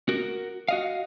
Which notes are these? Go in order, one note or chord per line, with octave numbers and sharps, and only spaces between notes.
F#4 A#4
F#4 D#5 F5